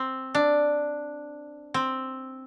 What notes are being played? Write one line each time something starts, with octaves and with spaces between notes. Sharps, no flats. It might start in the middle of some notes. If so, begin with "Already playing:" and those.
Already playing: C4
D4
C4